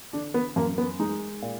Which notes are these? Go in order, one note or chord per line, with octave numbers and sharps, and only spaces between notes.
D3 D4
B3
F#2 A#3
B3
G#3 D#4
A#2